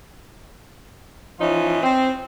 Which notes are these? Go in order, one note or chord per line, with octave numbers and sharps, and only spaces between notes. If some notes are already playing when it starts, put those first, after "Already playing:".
E3 F3 C#4 D#4 F4
C4